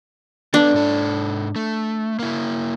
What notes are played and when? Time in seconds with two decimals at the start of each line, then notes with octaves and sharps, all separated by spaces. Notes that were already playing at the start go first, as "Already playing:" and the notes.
0.54 B3 D4 A4 B4
0.74 G#2 A4
1.56 A3
2.19 A#3 E4